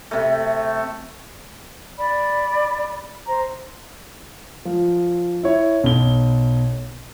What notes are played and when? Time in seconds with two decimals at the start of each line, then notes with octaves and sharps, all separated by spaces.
0.11 C3 A3
1.97 D5 B5
3.26 C5 A#5
4.65 F3
5.43 E4 C#5
5.84 B1 G7